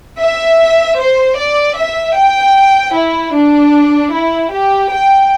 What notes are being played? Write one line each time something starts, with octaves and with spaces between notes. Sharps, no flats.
E5
C5
D5
E5
G5
E4
D4
E4
G4
G5